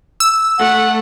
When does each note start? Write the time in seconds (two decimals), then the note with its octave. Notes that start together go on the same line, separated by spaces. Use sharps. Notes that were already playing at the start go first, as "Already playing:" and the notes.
0.20 E6
0.58 A3 F#5